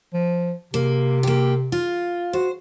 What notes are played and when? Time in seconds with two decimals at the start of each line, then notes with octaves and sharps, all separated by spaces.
0.14 F3
0.74 C3 A#3
1.23 A#3 G4
1.72 F4
2.33 F#4 C5